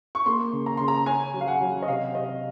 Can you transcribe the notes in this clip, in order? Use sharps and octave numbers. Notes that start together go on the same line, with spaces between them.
C#6
A#3 C6
C#3
A#5
C#3 C6
A#5
C#4 G#5
F#3
F5
F#5
F#3
D#5
C3 F5
C3 D#5